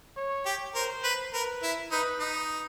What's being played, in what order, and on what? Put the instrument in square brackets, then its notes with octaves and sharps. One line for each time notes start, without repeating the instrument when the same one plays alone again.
[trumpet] C#5
[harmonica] G4
[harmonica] A#4 [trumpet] C5
[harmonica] B4
[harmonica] A#4 [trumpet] B4
[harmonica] E4
[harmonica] D#4 [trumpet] B4
[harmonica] D#4